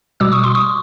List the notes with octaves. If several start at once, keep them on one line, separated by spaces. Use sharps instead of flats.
B2 G3 D6 E6
C#6 D#6
C6 D6
C#6 D#6